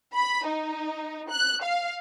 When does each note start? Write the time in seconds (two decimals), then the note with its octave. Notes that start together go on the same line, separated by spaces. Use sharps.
0.14 B5
0.47 D#4
1.31 F#6
1.63 F5